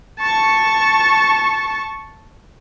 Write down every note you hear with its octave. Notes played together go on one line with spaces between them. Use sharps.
A5 C#6